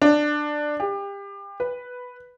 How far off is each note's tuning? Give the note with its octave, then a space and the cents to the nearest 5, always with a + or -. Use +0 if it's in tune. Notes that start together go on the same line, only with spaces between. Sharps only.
D4 +15
G4 +30
B4 +0